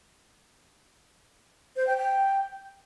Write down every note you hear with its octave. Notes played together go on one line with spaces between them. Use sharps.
C5
G5
G5